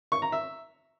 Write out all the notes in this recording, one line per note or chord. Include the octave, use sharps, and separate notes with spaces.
C#6
A#5
E5